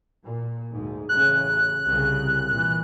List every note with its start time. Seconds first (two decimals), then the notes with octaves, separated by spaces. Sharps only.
0.23 A#2
0.74 D2 G#2
1.09 A1 C#3 F#6
1.85 C2 C#3
2.49 A#2 E3